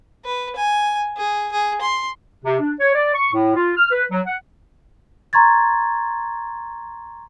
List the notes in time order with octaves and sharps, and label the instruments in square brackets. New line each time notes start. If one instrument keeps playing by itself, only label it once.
[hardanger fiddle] B4
G#5
G#4
G#4
C6
[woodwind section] C3
D4
C#5
D5
C#6
A2
F4
F6
B4
F#3
F#5
[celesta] A#5 C6 C#6 G#6 A6